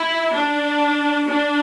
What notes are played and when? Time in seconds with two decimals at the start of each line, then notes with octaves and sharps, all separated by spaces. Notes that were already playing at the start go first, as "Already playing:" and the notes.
Already playing: E4
0.33 D4
1.28 D4